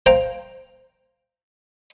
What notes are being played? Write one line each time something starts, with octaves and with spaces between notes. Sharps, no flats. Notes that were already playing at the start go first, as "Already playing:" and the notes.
C5 F5 G5 A#5